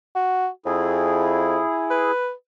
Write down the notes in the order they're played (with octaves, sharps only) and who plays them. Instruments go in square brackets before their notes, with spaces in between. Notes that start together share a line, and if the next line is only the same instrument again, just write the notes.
[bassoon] F#4
[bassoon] F2 [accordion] E4 G#4
[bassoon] B4